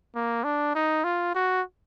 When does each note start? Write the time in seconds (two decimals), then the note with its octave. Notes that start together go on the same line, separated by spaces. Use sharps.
0.15 A#3
0.44 D4
0.75 D#4
1.04 F4
1.35 F#4